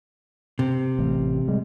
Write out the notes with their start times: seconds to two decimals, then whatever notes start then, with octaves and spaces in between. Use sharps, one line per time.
0.59 C3
0.99 A1
1.48 G3 G#3